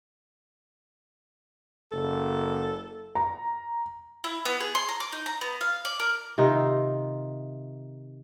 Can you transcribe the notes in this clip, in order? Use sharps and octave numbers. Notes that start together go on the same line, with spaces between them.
F#1 A4
A#5
E4
B3
G#4
C6
A#5
D6
D#4
A#5
B3
F5
D5
A#4
C3 D#3 D#4 F4